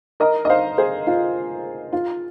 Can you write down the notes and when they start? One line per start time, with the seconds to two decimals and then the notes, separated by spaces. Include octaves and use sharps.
0.20 A#4 D#5
0.45 D#5
0.50 C5 F5
0.78 G#4 C5
1.07 F4
1.93 F4